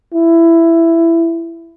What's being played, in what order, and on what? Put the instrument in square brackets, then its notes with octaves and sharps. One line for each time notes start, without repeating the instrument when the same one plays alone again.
[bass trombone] E4